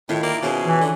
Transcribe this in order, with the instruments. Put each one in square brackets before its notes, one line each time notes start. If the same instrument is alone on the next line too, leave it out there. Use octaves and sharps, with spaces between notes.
[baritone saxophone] A2 [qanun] D#3 E4 F4
[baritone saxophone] A#3 [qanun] D5
[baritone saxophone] B2 [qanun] C#4 G#4 C5
[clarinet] E3
[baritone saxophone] D3